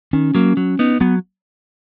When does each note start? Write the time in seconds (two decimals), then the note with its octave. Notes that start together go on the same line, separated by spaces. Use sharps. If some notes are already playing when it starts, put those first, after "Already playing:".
0.13 D#3 C#4
0.35 F#3 A#3
0.57 F#3
0.79 B3 D#4
1.00 F#3 B3